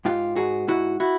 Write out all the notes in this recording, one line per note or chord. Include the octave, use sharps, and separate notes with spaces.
G#2 F4 G4
G#2 F#4 G#4
G#2 E4 F#4
E4 F#4